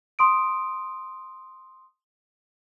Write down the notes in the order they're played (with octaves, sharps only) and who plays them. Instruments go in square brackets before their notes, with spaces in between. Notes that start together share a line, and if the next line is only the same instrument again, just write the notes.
[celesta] C6 D#6 D7